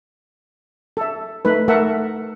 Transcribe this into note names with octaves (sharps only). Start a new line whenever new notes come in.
A4 E5
A3 D#4 B4
A3 A4 A#4 E5 F#5